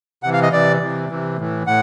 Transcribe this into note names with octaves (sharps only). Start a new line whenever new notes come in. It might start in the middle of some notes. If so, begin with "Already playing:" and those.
C3 E3 F#5
F5
D#5
C3 E3 D5
C3 E3
C3 E3
A2 E3
A2 F#5